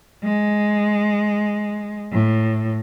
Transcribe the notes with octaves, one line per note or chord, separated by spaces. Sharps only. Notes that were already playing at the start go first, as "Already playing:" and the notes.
G#3
A2